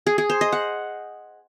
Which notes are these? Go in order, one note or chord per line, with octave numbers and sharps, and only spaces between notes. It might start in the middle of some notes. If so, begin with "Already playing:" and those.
G#4
G#4
C5
D#5
F#5